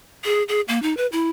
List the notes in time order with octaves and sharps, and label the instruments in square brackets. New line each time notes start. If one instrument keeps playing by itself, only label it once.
[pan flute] G#4
G#4
A#3
D#4
B4
E4